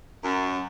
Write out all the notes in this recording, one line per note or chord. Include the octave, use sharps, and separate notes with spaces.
F#2